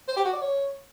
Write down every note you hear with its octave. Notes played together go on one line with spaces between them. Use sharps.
C5
G4
F#4
D5
C#5